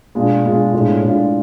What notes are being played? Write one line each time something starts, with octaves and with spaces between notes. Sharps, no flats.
B2 G#3 D4 F4
B2 G#3 D4 F4
A2 G#3 D4 F4
A2 G#3 D4 F4